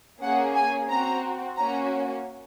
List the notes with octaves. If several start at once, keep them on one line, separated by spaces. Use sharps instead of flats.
A#3 C#4 G#4 F#5
G#5
C4 F#4 A#5
A#3 C#4 F#4 A#5